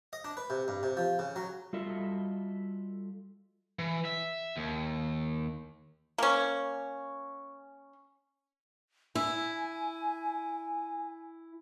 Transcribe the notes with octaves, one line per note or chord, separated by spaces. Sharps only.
D#5
D4
B4
C3
G2
C3
F3
C#3
F#3
G3 F4 F#4 A4 D#5 E5
E3
E5
D#2
A#3 C#4
E4 G#5